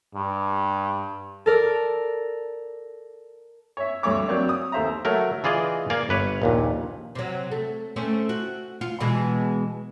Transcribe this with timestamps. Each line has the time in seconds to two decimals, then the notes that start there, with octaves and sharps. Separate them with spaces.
0.14 G2
1.46 A4 A#4 D5
3.77 C#5 E5
4.03 D2 G2 A3 C#5 D6
4.28 F#3 A#3 C4 C#5 D5
4.49 D#6
4.72 D#2 A3 C5 E5 A#5
5.05 F#3 A3 A#4
5.44 E3 F4 G#4 D5 D#5
5.90 A#3 D5 F5 G#5
6.09 G1 B4 C#5
6.42 A#1 D#2 A#2
7.15 C3 F#3
7.51 A3
7.96 A3 C4 C#4
8.29 F#4
8.81 F4
9.00 B2 E3 G#3